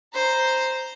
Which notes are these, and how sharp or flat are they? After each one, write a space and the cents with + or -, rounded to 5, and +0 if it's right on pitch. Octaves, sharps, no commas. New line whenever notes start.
C5 +0 A#5 +0